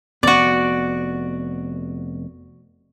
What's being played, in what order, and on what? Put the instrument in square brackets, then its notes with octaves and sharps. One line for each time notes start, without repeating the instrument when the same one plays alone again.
[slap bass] F1 B3 [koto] F#4 D5